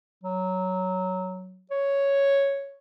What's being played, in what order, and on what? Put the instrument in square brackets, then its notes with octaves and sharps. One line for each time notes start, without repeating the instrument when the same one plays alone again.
[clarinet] F#3
C#5